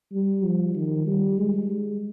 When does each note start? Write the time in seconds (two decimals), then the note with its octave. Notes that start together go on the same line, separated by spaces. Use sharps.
0.12 G3
0.44 F3
0.75 D#3
1.07 G3
1.38 G#3